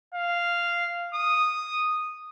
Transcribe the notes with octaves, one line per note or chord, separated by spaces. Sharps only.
F5
D#6